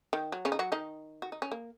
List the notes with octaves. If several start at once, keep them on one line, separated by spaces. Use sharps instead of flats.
D#3
F#3
C#3 C#4
D#4
F#3 F#4
D#3 D#4
F#4
D#4
C#4
A#3